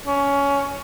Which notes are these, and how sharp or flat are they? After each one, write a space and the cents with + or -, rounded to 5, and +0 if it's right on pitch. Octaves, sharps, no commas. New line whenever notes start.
C#4 +15